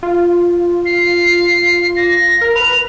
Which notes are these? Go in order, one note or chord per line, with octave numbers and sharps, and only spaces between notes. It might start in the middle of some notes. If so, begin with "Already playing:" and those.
F4
C7
A#6
A#4
B4 F7